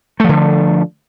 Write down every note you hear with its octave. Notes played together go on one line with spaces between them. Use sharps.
D3 F3 A3